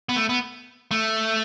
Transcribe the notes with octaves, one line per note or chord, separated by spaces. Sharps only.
B3
A3
B3
A3